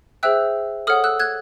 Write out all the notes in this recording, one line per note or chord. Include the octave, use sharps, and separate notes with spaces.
G#4 C5 E5 G5 E6 F#6
A4 C#5 F#5 D#6 F6
E6 F#6
F#6 G#6